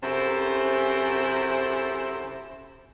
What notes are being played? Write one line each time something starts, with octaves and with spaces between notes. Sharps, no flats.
F#2 C3 E4 A4 C5